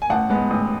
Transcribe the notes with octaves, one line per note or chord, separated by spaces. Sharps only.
G#5
A1 F#5 A5
G#2 G#3 B3
A1